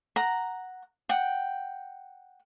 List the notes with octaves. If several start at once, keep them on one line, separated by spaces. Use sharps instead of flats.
F#5 A#5
F#5 G5